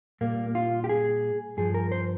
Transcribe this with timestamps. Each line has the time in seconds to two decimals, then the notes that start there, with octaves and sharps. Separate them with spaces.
0.21 A#2 G3 A#3
0.55 F4
0.84 G4
0.89 G#4
1.57 G2 F3 G#4
1.74 A#4
1.92 C5